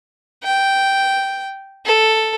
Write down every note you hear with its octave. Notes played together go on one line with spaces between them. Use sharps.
G5
A4